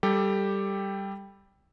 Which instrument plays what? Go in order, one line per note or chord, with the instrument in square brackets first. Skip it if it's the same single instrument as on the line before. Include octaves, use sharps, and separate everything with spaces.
[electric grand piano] G3 G4 A4